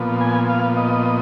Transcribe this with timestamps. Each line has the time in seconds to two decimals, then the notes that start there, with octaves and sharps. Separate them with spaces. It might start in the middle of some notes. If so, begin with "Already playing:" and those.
Already playing: A#2 F3 B3
0.21 G#5
0.49 F5
0.76 D#5